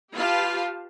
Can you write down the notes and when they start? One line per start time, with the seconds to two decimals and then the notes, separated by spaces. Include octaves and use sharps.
0.14 F4 G4 B4 F5 A5